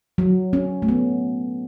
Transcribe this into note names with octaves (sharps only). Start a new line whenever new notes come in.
F#3
C#4
A3
B3